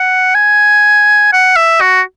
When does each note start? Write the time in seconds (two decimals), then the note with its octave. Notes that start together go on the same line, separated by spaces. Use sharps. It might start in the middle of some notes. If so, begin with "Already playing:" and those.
Already playing: F#5
0.35 G#5
1.33 F#5
1.56 E5
1.81 F#4